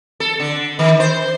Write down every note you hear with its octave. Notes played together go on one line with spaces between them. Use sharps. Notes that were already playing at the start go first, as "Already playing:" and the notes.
A4
D3
D#3
C5